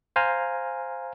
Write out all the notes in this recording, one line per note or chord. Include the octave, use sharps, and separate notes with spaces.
C5 F5 G#5 A#5